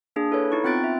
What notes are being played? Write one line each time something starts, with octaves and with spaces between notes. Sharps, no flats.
A#3 D4 G#4
E4 A4 B4 C#5
D#4 E4 C#6
B3 C4 F4 F#6 A6 D7
E5